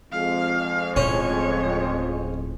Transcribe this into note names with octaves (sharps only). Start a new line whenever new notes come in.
F2 G#3 F5
D1 A2 C#4 C#5